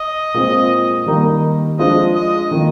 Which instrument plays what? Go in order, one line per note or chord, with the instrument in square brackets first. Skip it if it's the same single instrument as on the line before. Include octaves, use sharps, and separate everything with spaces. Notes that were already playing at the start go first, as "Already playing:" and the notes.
Already playing: [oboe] D#5
[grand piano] A#2 G#3 C4 F4 C5
D#3 G3 A#3 D#4
[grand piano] F3 G#3 D4 F4 C5 [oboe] D#5
[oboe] D#5
[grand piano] D#3 A#3 F4